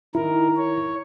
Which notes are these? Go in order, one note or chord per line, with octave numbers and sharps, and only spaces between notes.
D#3 E4 A#4
C#5